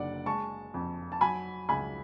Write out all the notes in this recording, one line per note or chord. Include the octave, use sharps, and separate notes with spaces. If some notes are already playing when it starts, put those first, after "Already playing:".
Already playing: F#1 D3 D5 F#5
G#3 A5 C#6
F2
A5
F#3 G#5 B5
C#2 G#5 B5